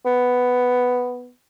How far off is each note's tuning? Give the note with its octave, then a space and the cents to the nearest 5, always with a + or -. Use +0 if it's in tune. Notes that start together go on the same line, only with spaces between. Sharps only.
B3 +5